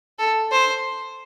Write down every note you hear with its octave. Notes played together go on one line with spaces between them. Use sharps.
A4
C5